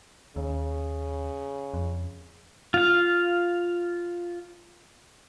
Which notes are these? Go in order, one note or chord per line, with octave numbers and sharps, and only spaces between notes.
D#2 C#3
F2
F4 F5